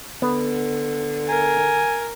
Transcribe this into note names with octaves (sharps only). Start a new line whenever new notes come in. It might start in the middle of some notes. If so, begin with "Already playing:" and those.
D3 B3
A#4 G#5